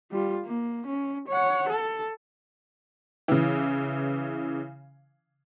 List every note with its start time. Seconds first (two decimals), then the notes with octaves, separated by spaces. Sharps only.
0.12 G3 F4
0.45 A#3
0.86 C#4
1.28 C#5 F#5
1.69 A4
3.28 C#3 E3